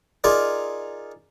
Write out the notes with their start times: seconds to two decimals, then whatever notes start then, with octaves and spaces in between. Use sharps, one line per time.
0.24 D#4 F4 G#4 A#4 D5